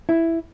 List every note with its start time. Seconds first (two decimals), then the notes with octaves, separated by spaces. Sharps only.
0.09 E4